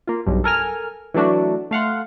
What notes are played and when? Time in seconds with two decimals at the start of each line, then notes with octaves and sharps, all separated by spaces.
0.07 A#3 F4
0.26 B1 G2
0.44 A4 A#4 G#5 F6
1.14 E3 F#3 A3 D4 F#4
1.71 A3 F5 F#5 C6